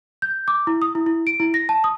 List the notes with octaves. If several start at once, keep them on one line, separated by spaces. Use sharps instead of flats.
G6
D6
E4
D#6
E4
E4
D7
E4
A#6
A5
D#6